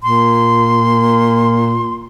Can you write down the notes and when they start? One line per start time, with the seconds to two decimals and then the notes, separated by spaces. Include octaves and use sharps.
0.03 A#2 C6